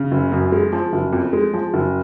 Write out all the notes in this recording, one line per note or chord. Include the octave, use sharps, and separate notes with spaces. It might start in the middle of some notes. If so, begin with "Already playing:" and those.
Already playing: C#3
F#1
F#2
G#3
F3
F#1
F2
G#3
F3
F#1